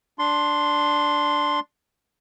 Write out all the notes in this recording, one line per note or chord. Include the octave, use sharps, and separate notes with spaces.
D4 C6